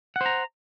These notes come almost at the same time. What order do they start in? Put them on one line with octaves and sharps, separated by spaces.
F#5 C5 A#5